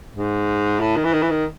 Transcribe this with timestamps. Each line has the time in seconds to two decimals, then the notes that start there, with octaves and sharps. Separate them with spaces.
0.16 G#2
0.80 A2
0.96 D#3
1.05 E3
1.13 D#3
1.22 E3
1.30 D#3